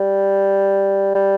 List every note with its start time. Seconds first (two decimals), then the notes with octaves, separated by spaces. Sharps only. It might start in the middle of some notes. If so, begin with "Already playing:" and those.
Already playing: G3
1.15 G3